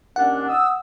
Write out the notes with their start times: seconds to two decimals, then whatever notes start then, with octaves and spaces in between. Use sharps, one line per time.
0.16 D#2 C#4 D4 F#5
0.49 D#6 E6